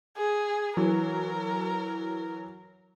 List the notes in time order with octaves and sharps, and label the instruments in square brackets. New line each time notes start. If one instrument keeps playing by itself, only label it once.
[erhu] G#4
[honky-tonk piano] E3 F#3 [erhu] A#4